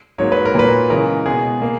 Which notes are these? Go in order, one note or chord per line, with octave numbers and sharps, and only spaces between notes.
G#2 F#3 A#3 C#5
B4
A#4
A#2 F#3 A#3 B4
C#3 E3 G#3 A#4
B2 G#3 B3 G#4
A#3